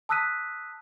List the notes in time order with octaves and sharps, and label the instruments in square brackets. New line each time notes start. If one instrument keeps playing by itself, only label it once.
[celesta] A5 D#6 E6 F#6 B6 D#7